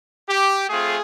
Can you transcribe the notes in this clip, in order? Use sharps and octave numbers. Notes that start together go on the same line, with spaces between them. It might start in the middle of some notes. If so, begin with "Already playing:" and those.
G4
A3 C4 F4 G#4